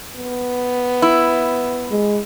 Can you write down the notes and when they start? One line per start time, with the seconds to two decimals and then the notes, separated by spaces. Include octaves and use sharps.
0.16 B3
1.02 E4
1.91 G#3